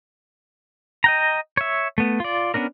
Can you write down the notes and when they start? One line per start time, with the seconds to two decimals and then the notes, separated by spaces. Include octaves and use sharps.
1.04 D#5 G5 A#5
1.57 C#5 E5
1.98 A3 B3
2.20 F4 D5
2.54 B3 C#4 D4 A#4